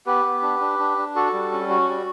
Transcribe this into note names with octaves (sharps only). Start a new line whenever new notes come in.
B3 G4 B4
B3
D4
D4
D4
D4
F#4 A4
G3
C#4
F#4
G3